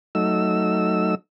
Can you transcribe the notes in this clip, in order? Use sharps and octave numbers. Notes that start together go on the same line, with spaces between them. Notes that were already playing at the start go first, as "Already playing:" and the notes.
F#3 A3 D#4 E6